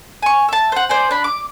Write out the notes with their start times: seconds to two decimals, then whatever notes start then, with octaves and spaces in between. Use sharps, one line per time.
0.22 G#5 C#6
0.48 E5 A5
0.72 C5 F#5
0.89 C5 D5 G#5
1.11 D4 B5
1.24 D6